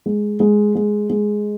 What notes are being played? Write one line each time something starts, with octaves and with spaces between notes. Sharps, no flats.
G#3
G#3
G#3
G#3